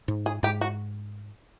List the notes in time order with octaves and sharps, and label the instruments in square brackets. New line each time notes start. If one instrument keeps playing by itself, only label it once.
[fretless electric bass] G#2
[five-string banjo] G#4
[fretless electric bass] G#2 [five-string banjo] G4
[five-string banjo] F#4